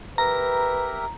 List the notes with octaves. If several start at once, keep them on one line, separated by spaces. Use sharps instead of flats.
G4 A#4 B4 E5 A#5